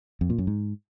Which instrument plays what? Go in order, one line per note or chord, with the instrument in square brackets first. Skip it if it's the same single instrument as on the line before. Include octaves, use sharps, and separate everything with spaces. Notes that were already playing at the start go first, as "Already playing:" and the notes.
[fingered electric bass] F2
A#2
F#2
G#2